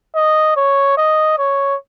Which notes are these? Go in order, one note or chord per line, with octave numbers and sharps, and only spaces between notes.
D#5
C#5
D#5
C#5